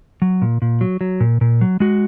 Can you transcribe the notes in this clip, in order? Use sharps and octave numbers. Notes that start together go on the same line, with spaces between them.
F#3
A#2
A#2
F#3
F#3
A#2
A#2
F#3
G#3 F#4